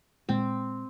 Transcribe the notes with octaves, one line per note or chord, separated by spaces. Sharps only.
A#2 G#3 C4